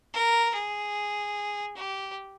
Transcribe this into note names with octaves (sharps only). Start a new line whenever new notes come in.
A#4
G#4
G4